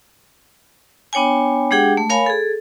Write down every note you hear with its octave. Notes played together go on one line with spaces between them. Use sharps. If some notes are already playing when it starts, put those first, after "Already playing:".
B3 D4 C#5 G5 G#5
G#3 D4 G4 G#4 F#5 G5
A3
A#4 C#5 F5 G#5 B5
G#4 A4